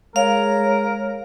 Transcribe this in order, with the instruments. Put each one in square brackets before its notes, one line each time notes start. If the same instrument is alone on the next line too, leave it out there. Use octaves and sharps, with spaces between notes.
[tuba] G#3 [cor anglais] A#4 [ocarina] C#5 [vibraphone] F5